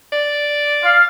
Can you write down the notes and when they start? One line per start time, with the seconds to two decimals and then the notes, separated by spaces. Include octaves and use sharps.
0.12 D5
0.83 F5